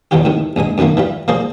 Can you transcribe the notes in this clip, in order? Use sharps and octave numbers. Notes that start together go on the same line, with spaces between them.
E2 B2 F3 F#3 F4 G4
A2 C3 D#3
A#1 G2 G#3 G#5
F#2 B2 D#3 A3 A#3
E3 G3 F4
F3 A#3 G#4 C5 D5